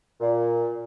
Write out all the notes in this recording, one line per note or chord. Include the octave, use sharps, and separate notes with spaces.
A#2